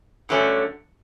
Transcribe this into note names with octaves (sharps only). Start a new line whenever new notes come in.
G2 D3 F#3 A3 C#4